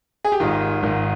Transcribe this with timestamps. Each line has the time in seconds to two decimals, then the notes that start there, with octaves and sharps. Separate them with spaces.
0.25 G#4
0.32 G4
0.40 G#1 G#2 D#3 F4
0.83 G#1 G#2 D#3